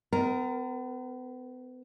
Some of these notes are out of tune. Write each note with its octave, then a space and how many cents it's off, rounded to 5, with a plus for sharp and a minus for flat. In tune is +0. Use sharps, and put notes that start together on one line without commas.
B3 +45 A#4 +0